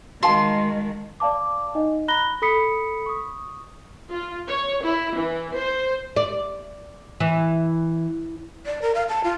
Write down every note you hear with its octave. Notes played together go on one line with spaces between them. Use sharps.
D#3 G#3 F#4 F5 A5 C6
D5 F5 A5 D6
D#4 D#5
A#5 B5 F#6 A#6 G7
A4 B5 D#6 B6 C#7
C#6 D#6
F4
C#5
E4
E3
C5
D5
E3
D5
A#4
F5
A5
F4